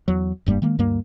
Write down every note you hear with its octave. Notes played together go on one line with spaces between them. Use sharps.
E2 F#3
F1 G2 G3 A#3
D#3 G#3 A#3
D2 G2 G3 A#3